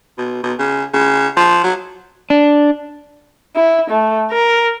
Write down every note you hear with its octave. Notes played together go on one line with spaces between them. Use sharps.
B2
B2
C#3
C#3
F3
F#3
D4
E4
A3
A#4